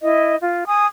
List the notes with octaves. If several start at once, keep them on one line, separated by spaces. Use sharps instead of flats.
E4 D#5
F4
G#5 D#6